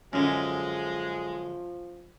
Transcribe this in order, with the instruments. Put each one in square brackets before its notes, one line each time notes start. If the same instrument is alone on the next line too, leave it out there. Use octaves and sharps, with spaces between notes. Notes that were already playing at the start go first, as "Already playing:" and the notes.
[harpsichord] F#2 D3 [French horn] F3 [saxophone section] G#3 [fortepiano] C#4